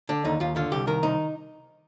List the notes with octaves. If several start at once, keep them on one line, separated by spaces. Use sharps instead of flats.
D3 D4
D#2 D#4
D#2 F4
D3 F4
C2 G4
D#3 A#4
C2 D#4